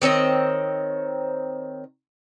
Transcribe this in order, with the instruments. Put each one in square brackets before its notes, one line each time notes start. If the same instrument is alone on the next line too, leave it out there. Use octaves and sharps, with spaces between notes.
[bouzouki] D#3 C4 C#5 D#5